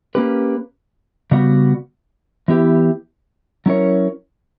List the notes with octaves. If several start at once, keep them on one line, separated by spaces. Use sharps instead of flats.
A#3 C#4 G4 B4
C#3 G3 B3 F#4
E3 B3 E4 G4
F#3 C#4 E4 A#4 C#5